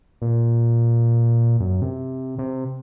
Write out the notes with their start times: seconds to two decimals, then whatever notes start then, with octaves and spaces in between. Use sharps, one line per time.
0.22 A#2
1.60 F#2
1.82 C3
2.39 C3